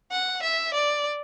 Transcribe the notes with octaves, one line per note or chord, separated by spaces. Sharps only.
F#5
E5
D5